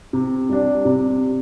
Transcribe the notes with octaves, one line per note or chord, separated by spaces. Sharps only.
C3
G3 D4
C3